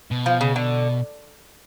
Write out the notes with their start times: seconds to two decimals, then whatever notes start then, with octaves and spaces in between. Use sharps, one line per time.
0.11 B2
0.26 F3
0.41 C#3
0.56 D3